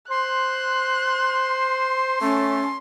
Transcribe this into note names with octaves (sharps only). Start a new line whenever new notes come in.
C5 C6 F#6
A3 C#4 A4